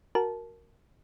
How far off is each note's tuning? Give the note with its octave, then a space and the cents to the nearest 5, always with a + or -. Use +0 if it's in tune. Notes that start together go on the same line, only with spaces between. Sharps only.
F#4 +0 A#4 +0 A5 -15